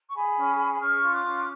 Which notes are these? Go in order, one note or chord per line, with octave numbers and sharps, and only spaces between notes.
C#6
G#4 G#5 B5
C#4
G#4
C#4 C#6 F6
F4
D6 F#6
C#4